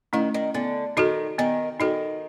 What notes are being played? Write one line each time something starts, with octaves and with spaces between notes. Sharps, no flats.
D#3 A3 C#4 E4
D#3
D3 B3
D#3 D#4 F#4 A4
D#3 B3
D#3 D#4 F#4 A4